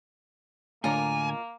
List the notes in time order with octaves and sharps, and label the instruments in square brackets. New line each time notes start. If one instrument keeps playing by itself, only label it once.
[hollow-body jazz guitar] A2 D3 [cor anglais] A#3 [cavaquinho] F4 A#4 D#5 [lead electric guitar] G#5